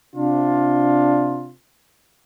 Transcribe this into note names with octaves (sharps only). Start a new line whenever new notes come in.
C3 D4 F4